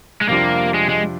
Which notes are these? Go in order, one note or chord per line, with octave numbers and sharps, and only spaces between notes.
G#3
F2 C3 G3 A#3 D4 F4
G#3
G#3